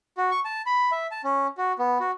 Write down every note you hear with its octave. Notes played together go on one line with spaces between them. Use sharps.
F#4
C#6
A5
B5
E5
A5
C#4
F#4
B3
F#4